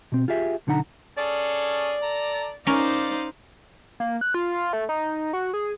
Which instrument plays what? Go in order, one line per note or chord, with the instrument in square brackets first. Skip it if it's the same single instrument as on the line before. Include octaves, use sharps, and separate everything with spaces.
[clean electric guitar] B2 C4
F4 G4 G#4 E5
B1 D3 D#4 F#5 A#5
[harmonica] C#4 G#4 A4 [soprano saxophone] D5
[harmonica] A4 A#5
[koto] C#4 A#4 [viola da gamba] D#4 C5 [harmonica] D5 F5
[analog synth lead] A#3
F#6
F4
A3
D#4
F#4
G#4